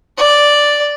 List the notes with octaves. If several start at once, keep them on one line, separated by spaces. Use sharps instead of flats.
D5